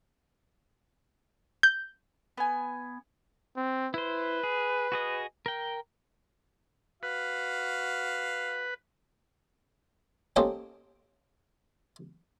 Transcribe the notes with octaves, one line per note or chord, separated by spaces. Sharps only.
G6
B3 G#5
C4
E4 B4 C5
G#4
F#4 G#4 D#5
A#4 G5
F#4 B4 F5
A#3 C#4 G4 A4 C5 D#5